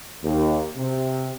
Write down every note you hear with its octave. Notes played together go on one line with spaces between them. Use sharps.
D#2
C3